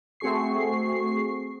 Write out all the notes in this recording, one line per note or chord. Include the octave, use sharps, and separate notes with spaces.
A3 C4 F#4 G#4 C#6 C7